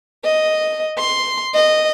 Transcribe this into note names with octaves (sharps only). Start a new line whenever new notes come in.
D#5
C6
D#5